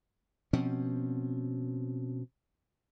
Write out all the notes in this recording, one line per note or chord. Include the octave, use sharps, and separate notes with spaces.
B2 F3 C4 C#4